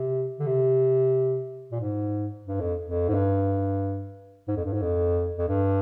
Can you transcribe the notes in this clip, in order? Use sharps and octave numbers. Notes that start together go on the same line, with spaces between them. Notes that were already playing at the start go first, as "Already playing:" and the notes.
Already playing: C3
D3
C3
A#2
G#2
G2
F2
F2
G#2
G2
G#2
F2
G2
G#2
F2
F2
G2